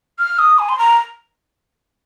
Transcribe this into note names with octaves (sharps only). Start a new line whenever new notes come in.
F6
D#6
G#5
C6
A#5